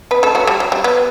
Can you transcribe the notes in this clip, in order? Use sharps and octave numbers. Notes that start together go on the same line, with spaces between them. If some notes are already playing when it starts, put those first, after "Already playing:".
B3 B4
A3 A4
F#3 F#4
G3
F#3
G3
B3